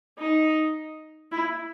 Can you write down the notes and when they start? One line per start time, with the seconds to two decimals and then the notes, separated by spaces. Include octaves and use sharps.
0.18 D#4
1.32 E4